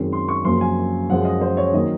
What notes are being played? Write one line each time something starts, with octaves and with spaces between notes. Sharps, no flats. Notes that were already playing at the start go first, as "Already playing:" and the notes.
Already playing: F#2 D#3 G#3 C4
C6
C#6
F#2 C#3 F3 A#3 C6
G#5
F#2 C#3 F3 G#3 F#5
D#5
C5
C#5
D#3 F#3 A#3 D#5